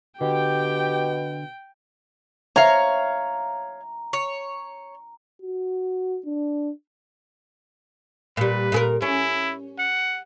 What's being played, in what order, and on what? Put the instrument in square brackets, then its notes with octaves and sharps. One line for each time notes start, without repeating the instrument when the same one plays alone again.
[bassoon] B2 [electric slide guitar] D3 [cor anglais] G4 [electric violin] G5
[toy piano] B4 E5 C#6 [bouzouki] C#5 F5 [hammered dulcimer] A#5
[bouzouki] C#5
[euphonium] F#4
D4
[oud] A#2 G3 [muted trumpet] B4
[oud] A#2 G#4 A#4
[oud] C#4 [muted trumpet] E4
[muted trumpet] F#5